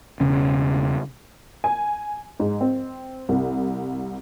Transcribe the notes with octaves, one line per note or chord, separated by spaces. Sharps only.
E1 C#3 C#4
G#5
G#2
C4
C2